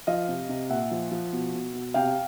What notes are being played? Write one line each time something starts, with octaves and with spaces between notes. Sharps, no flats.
F3 D#5 F5
C3
C3
A#2 E5 F#5
F3
F3
B2
B2
B2
C3 F5 G5